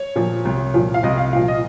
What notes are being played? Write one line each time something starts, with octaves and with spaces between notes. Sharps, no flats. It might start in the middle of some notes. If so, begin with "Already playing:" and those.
Already playing: C#5
A#2 F3
C2
A#2 F3
F5
C2 D#5
F5
A#2 F3 F5
D#5